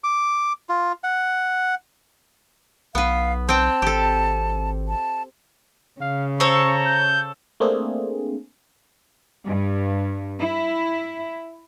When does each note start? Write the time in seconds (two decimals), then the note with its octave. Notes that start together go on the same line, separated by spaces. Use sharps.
0.04 D6
0.69 F4
1.04 F#5
2.95 B1 B3 B4 F5
3.49 C4 G5 A5
3.82 G#1 G4 A4
4.88 A5
6.01 C#3 F5
6.40 A4 C5 C#5 A#5 C#6
6.86 G6
7.60 A3 A#3 C4 D4 G#4
9.46 G2
10.39 E4